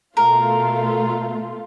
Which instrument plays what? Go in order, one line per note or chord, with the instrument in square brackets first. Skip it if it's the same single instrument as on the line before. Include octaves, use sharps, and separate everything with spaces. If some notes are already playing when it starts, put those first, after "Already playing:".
[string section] B2 A3 F4 [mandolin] A#4